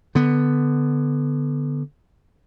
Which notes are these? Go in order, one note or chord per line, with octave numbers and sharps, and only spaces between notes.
D3 B3